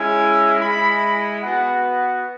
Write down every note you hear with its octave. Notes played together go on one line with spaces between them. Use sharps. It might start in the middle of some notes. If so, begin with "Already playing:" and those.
Already playing: G#3 C#4 E4
G#3 E4 B5
B3 F#4 F#5